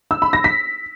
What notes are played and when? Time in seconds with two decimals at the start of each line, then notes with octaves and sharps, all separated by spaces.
0.11 E6
0.22 B5
0.33 A#6
0.44 B6